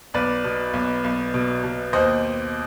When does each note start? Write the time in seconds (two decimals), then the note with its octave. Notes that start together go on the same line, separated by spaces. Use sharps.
0.14 B1 B4 D5
0.44 B2
0.73 B1
1.04 B1
1.34 B2
1.63 B2
1.93 D#2 C5 D#5